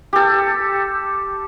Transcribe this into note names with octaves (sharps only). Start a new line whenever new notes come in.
G4 A4